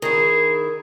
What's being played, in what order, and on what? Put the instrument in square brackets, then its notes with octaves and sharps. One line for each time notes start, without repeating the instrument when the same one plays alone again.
[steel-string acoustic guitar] D#3 E4 [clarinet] G#4